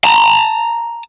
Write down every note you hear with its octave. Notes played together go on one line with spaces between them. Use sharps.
A5 A#5